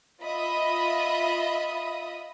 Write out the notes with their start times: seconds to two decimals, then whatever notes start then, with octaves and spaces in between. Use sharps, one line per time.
0.22 F4 D#5 E5 B5 D#6